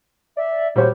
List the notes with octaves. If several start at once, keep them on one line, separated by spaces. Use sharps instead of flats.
D5 E5
A#2 G3 F#4 C5 C#5